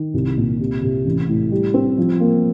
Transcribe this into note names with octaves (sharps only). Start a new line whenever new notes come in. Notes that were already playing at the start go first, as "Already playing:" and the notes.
Already playing: D#3
C2
A#2
C3
C3
A1
A2
G3
C4
F3
A#3